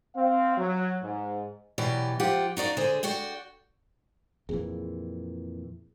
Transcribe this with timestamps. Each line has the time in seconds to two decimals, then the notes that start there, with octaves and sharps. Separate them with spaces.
0.16 C4 F5
0.58 F#3
1.02 G#2
1.78 B2 E3 F#3 G4 D5
2.20 F3 F4 G4 F#5
2.57 D#4 F#4 D5 F5
2.77 D3 G#4 C5
3.03 F#4 D5 F#5 G5
4.49 F2 A#2 E3 G#4